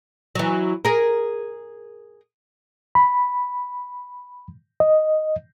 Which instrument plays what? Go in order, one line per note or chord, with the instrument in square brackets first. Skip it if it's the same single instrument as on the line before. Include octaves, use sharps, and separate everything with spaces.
[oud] E3 F#3
G#4 A#4
[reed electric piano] B5
D#5